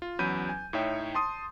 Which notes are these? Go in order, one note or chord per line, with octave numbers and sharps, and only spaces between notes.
F4
E2 F#3 C#4 B5 G6 D#7
G#5
A2 D#4 C#5 E5 G5
A5 C6 D#6